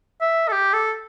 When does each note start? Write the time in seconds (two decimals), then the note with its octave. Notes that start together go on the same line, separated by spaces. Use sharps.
0.21 E5
0.48 A4
0.52 G4
0.73 A4